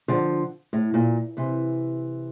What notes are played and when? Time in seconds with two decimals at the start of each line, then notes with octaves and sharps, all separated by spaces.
0.08 D3 F3
0.73 A2
0.94 A#2
1.37 C3 E3